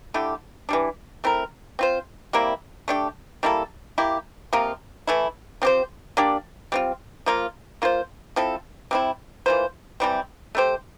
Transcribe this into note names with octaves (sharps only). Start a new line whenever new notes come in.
D3 A3 E4 G4
E3 G3 D4
A3 C4 E4 A#4
C4 F4 C5
C3 G3 A#3 E4
A3 D4 G4
G3 A#3 E4 A4
A#3 E4 G4
C3 F3 A#3 F4
E3 A3 E4
F3 C4 G4 C5
A#3 D4 G4 D5
G3 C4 F4
F3 A#3 F4
A#3 F4 C5
F3 C4 E4 A4
C3 G3 C4 E4
E3 A#3 F4 C5
C3 E3 G3 C4
A3 E4 G4 C5